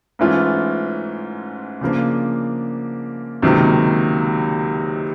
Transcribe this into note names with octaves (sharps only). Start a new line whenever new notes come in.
G#2 E3 A3 C#4 F4
C#3 F3 A#3 D4
C#2 C3 D#3 F#3 A#3